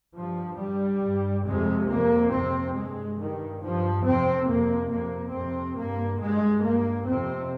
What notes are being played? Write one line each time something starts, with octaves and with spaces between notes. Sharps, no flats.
G2 F3
G2 G3
G2
F2 C3 G#3
F2 C3 A#3
F2 C3 C4
G2 G#3
G2 D#3
G2 F3
F2 C3 C4
F2 C3 A#3
F2 C3 A#3
F2 C3 C4
G2 A#3
G2 G#3
G2 A#3
F2 C3 C4